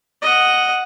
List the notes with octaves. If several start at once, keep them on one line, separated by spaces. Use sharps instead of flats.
D#5 F#5